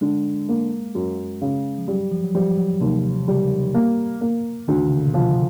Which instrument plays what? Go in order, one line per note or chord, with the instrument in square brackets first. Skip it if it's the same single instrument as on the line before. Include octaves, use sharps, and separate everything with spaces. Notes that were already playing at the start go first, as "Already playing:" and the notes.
[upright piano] D3 [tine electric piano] G#3
[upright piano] A#3
F#2
C#3
[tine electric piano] F3
[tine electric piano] F#3 [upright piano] G3
[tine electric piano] F3
F#3
[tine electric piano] F3 [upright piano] G3
[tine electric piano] F#3
[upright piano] D#2 [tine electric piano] C3
[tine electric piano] C#3 [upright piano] G3
[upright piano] A#3
A#3
[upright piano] D2 [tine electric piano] D#3
[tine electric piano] D3
C#3
D3
B2
[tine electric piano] C3 [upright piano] F3